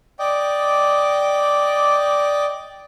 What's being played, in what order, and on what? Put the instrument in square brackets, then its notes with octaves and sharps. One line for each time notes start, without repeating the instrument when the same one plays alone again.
[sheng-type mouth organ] D5 D#5 G5 D6